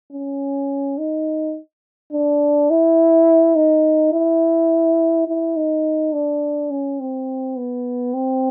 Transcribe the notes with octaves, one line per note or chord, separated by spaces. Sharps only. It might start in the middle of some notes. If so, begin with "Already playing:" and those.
C#4
D#4
D4
E4
D#4
E4
E4
D#4
D4
C#4
C4
B3
C4